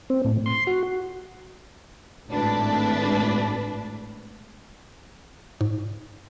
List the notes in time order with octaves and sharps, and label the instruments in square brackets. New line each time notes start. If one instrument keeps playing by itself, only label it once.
[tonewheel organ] C4
A2
C6
F#4
[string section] G#1 A2 D4 B4
[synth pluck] G#2